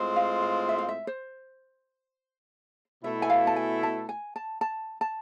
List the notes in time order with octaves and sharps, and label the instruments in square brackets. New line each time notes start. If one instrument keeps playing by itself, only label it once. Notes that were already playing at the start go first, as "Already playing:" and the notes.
Already playing: [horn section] A2 G#3 C4 F4
[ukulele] F5
F5
E5
F5
E5
C5
[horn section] B2 A3 E4 [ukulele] E5
[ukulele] G#5
F5
A5
G#5
A5
G#5
A5
A5
A5